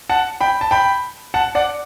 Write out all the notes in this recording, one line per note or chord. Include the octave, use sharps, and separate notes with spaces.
F#5 A5
G5 B5
A5
G5 B5
F#5 A5
D5 F#5